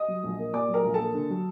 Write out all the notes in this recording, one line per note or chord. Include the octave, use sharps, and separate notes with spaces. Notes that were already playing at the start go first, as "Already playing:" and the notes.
Already playing: D#5 D#6
F#3
A#1
A#3
A#2 D5 D6
F#3
A#4 A#5
A#1
A4 A5
A#3
D3
F#3